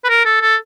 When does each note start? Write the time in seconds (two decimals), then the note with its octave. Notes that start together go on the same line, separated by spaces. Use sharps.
0.05 B4
0.09 A#4
0.25 A4
0.41 A4